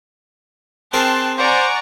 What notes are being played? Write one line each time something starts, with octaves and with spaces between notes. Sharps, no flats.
C4 G#4 A#4 G5 A5 C6 F#6
C5 D5 F#5 G#5 A#5 C#6